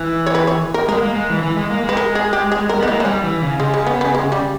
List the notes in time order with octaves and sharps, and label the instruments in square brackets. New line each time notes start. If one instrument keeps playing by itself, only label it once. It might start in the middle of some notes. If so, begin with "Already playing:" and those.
Already playing: [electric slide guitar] E3
[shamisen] C#5
B4
C#5
A#4
[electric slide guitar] G#3 [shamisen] A#4
[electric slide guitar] B3
A#3
G#3
E3
E3
G#3
A#3
G#3
[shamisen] B4
A#4
G#4
G4
G#4
A#4
[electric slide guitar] B3 [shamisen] D#4
[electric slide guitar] A#3 [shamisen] E4
[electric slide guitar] G#3
[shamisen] D#4
[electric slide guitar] G3 [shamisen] C#4
[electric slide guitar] E3
C#3
[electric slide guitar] C#3 [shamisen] G#3
[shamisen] G#3
B3
B3
G#3
G3